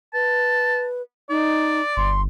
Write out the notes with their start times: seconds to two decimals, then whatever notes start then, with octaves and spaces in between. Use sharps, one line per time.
0.14 B4 A5
1.30 D#4 D5
1.97 G1 C6